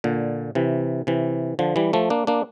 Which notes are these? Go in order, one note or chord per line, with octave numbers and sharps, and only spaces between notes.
A#2 D3
C3 E3
C3 E3
D3 F3
E3 G3
F3 A3
A#3 D4
A#3 D4